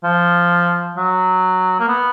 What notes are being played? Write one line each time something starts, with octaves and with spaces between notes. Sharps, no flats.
F3
F#3
A#3
B3